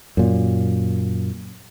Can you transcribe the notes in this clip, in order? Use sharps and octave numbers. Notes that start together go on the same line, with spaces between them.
F#2 A#2